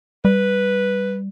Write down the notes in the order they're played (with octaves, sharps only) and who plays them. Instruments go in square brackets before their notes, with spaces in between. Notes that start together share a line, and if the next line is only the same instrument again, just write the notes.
[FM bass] G3 [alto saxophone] B4